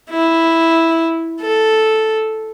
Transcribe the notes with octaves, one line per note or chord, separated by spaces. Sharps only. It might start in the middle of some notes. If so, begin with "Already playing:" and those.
E4
A4